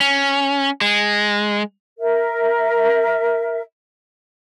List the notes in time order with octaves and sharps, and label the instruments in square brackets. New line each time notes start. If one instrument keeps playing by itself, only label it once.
[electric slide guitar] C#4
G#3
[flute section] A#4 E5